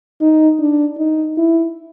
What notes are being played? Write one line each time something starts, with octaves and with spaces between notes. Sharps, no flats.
D#4
D4
D#4
E4